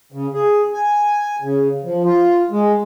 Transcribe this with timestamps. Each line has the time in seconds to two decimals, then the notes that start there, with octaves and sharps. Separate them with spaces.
0.12 C#3
0.34 G#4
0.74 G#5
1.42 C#3
1.84 F3
2.04 F4
2.51 G#3